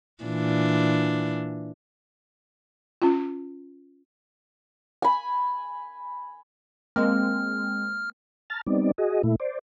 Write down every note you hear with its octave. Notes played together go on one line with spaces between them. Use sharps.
A#2 E3 D4
C#4 F4
G#5 B5
G#3 A#3 C4 F6
A5 A#5 F6 A6
G3 B3 C4 D#4 D5
F#4 G#4 D#5
A#2 A3 E4
C5 D5